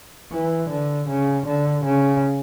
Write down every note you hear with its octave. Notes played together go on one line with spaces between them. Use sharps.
E3
D3
C#3
D3
C#3